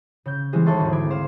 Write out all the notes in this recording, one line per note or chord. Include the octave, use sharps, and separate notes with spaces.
C#3 G6
E3 G3 G#3 C4
D#2 A4 E5 A5 C6 C#6
G#1 D2
B5 D6 G#6
C5 F5 C6